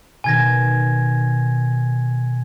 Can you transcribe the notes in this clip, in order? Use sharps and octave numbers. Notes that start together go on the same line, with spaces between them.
B2 D#3 G#5 G#6 A#6